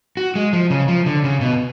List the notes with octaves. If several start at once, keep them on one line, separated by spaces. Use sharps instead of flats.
F#4
G#3
F3
C#3
F3
D3
C#3
B2